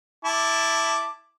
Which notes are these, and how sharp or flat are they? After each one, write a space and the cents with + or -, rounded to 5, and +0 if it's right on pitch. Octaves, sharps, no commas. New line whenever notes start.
E4 +0 A5 +0 D6 +0